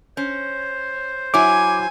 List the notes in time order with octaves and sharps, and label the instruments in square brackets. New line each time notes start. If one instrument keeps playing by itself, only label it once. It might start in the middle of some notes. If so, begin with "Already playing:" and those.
[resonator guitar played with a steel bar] C#4 [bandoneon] C5
[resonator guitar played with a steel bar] F#3 E4 C#5 [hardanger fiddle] G#5 [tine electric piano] D6